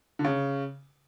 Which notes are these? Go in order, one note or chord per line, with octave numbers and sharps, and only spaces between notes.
D3
C#3